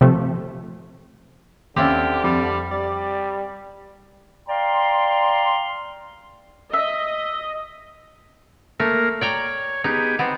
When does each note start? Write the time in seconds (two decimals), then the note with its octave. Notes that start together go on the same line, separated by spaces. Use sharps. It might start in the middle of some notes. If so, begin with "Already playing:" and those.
0.01 C3 F3 A3
1.76 D#2 D3 C4 C#4 E4 F4 G4
2.24 F2 G3
2.71 G3 D5
4.48 D5 F5 G5 A#5 C6
6.73 D#5 E5
8.80 A3 A#3 A#4
9.21 C#5 D5 G5 A#5
9.84 B3 D#4 G4 G#4
10.19 B3 C4